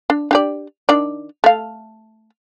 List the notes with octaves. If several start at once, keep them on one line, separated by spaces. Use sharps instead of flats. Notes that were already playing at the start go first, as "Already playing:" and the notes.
D4
D4 G4 D5
D#3 D4 D5
A3 F5